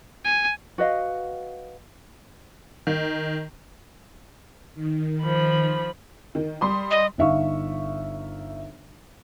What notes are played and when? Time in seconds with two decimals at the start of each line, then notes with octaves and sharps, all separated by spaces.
0.25 G#5
0.78 F#4 B4 D#5 F5
2.87 D#3
4.75 D#3
5.22 F3 B5
6.35 D#3
6.61 G3 C6 D#6
6.91 D#5
7.18 G1 D#4 E5 F5 C#6